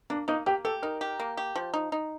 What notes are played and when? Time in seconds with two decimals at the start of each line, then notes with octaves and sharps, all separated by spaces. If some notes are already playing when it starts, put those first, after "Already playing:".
0.10 A#3 D4
0.28 A#3 D#4
0.46 A#3 G4
0.65 G4 A4
0.83 D#4 A#4
1.01 G4
1.20 A#3
1.37 G4
1.56 F3
1.74 D#4
1.92 D#4